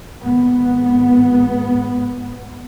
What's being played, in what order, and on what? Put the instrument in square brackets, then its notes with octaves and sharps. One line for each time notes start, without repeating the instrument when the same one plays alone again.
[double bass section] G#1 B3